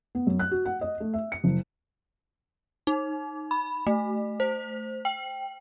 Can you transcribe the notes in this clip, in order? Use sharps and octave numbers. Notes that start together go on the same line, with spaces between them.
B3
F#2
F#6
F#4
F#5
D#5
A3
E5
C#7
F#1
D#4
B5
A3
C5
G5